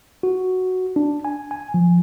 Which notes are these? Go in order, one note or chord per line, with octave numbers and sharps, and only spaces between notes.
F#4
D4
G#5
G#5
F3